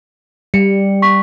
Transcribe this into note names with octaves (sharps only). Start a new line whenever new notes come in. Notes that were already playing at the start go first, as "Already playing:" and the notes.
G3 C#7
C#6 B6